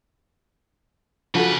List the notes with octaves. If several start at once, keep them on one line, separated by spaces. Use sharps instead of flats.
C#3 F3 F#4 A4 B4